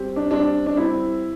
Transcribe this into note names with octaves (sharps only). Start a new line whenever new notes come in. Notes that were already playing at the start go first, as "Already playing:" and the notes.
Already playing: G3 C4 G4
D4
G3 C4 D4 G4
D4
G3 C4 E4 G4